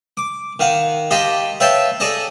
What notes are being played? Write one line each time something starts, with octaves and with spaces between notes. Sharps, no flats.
D6
D#3 F5 F#5
G4 D#5 F5 A5 B5 C6
B4 C#5 E5 F5 G5 A5
G#4 A4 D5 D#5 A5